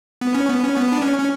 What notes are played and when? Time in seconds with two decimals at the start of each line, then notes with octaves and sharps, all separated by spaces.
0.21 B3
0.35 C#4
0.49 B3
0.63 C#4
0.77 B3
0.92 D4
1.02 C#4
1.19 C#4